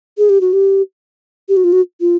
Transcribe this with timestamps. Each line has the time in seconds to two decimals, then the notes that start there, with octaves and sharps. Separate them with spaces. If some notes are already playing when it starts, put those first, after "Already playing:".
0.18 G#4
0.29 G4
0.41 F#4
0.53 G4
1.49 G4
1.57 F#4
1.64 F4
1.73 F#4
2.01 F4